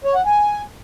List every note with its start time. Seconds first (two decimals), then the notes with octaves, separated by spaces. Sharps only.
0.04 C#5
0.15 F#5
0.25 G#5